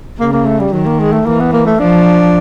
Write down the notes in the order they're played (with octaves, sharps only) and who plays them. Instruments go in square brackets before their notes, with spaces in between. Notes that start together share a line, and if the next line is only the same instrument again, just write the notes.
[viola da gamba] C#3 [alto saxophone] A#3
[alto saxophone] A#3
A3
G3
[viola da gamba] D#3 [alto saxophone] F#3
[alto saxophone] A#3
G#3
A3
[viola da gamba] E3 [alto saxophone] A#3
[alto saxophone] B3
A#3
A3
[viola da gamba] F3 [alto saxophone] D4